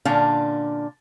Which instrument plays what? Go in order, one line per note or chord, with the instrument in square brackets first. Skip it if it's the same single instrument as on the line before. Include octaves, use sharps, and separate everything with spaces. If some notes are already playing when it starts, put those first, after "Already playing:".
[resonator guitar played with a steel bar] A#2 D3 C#4 D4 F5